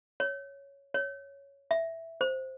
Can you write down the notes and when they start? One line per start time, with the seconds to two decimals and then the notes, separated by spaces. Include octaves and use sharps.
0.20 C#5
0.94 C#5
1.71 E5
2.21 C5